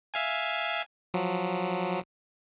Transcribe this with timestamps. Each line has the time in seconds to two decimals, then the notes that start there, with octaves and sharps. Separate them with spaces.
0.14 E5 F5 G#5
1.14 F3 F#3